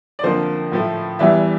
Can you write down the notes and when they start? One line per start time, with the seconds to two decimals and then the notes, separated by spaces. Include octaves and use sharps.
0.19 D5
0.23 F2 D3 F3 A#3 C5
0.72 A2 F3 A3
1.19 E2 E3 G3 E5